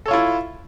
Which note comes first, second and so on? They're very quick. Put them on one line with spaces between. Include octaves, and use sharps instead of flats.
A4 C#5 F4 E4